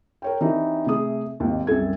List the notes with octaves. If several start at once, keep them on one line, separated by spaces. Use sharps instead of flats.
A#4 C#5 G5
E3 C4 D4 D#4 G4
C3 A3 G#4 D#6
G#1 D#2
C2 F#2 A4 G#6